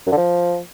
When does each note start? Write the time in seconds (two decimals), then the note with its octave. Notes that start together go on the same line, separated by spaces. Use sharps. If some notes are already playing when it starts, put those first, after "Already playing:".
0.07 F#2
0.12 D3
0.17 F3